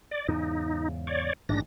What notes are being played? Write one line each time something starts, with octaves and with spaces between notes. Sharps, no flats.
D5
E2 G#2 C#3 D#4
C#5 D5
A1 G#2 D#3 D4 A#6